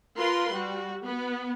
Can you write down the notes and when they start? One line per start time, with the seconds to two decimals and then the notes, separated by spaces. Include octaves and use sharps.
0.18 F4 A#4 B4 C6
0.52 G3 F#4
1.04 B3